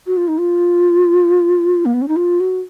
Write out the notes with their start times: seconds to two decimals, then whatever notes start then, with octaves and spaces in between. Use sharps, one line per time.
0.07 F#4
0.17 F4
0.28 D#4
0.38 F4
1.86 A#3
1.94 B3
2.02 C#4
2.08 D#4
2.16 F4
2.40 F#4